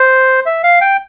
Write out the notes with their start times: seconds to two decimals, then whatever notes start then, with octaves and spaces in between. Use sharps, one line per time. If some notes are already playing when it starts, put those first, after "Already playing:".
Already playing: C5
0.46 E5
0.64 F5
0.81 G5